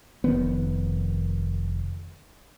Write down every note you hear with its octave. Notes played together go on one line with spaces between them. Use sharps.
F1 D#3 B3